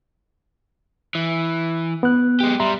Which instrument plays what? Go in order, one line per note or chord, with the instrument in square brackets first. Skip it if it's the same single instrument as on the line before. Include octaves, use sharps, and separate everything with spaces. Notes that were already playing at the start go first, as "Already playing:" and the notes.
[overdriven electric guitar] E3
[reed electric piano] B3 F#6
[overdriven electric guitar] G#3 G4
[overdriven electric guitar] G3 [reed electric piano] E5 A#5 C6